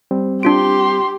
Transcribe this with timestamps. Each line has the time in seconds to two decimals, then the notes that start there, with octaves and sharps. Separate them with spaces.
0.11 G3 C4
0.43 D4 F4 G4 C6 D7